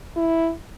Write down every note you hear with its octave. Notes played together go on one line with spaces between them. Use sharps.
E4